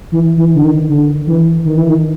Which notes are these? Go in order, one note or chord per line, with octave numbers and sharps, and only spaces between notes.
E3
E3
D3
D#3
D3
E3
D#3
E3
D#3